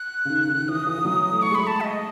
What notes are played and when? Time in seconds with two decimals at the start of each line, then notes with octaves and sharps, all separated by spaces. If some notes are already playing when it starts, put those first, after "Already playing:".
Already playing: F#6
0.25 C#3
0.30 D#3
0.49 D#3
0.68 E3 D#6
0.87 E3
0.98 E3
1.05 F#3
1.31 A3
1.42 A3 C#6
1.51 G#3
1.55 A3 B5
1.67 A5
1.81 E5
1.84 D#5